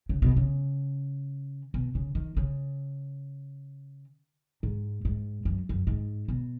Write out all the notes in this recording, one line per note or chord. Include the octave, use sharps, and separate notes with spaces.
C#3
B2
C#3
B2
C#3
D#3
C#3
G#2
G#2
F#2
F#2
G#2
B2